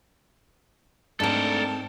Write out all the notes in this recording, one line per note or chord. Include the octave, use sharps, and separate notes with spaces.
G#2 G#3 A3 C4 D4 A4 A#4 A5